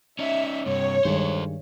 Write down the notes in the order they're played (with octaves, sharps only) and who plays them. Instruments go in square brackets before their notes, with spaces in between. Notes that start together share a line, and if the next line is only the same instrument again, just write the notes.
[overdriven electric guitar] C#4 D#4 [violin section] E5
[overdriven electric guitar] G2 C3 [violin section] C#5
[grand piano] G2 D#3 G#3 [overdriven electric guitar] A4 C5